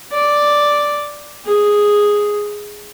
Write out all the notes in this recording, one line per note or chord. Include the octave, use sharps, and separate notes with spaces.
D5
G#4